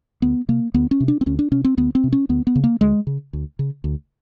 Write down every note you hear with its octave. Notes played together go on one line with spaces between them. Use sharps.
D2 B3
C3 A#3
D2 B3
C#4
C3
D4
C4
D2 C#4
D4
C3 C#4
C4
D2 B3
C4
C3
C#4
D2 B3
B3
C#3
A#3
D2 G#3
C#3
D2
C#3
D2